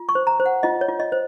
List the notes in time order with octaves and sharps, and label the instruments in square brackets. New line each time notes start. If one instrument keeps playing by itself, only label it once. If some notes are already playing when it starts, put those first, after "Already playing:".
Already playing: [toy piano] F4
C#6
C5
A#5
C5
F#5
F4 D#5
C#5
F4
D#5
C5